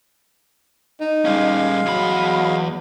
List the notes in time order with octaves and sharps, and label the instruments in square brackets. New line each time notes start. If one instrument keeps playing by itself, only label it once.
[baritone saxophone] D#4
[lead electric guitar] G3 C#4 [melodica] G#3 F5
[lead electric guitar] E2 B5 [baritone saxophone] F#3